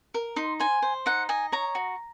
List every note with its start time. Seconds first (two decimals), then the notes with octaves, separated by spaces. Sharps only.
0.14 A#4
0.36 D#4 C6
0.60 C5 G#5
0.82 C5
1.06 D#4 F#5
1.29 D#5 G#5
1.52 C#5 A#5
1.75 F#4